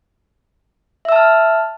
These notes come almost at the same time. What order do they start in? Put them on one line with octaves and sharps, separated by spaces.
E5 E6 A5 F6